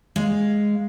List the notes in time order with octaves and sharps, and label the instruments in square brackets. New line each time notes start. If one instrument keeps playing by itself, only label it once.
[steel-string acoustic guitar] G#3 F5